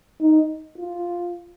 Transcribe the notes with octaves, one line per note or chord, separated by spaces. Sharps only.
D#4
F4